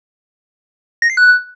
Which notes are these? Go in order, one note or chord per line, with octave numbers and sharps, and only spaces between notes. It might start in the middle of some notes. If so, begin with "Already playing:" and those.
A#6
C7
F#6